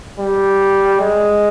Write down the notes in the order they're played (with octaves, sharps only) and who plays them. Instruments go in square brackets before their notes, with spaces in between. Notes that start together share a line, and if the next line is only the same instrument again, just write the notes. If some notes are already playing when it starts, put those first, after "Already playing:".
[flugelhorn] G3
G#3